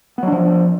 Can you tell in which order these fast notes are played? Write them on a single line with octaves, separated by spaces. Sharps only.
B3 F#3 D4 F3